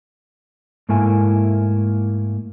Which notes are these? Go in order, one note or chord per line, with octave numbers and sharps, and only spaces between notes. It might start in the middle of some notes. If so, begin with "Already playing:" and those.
G#2 A3 A#3 E4 G#5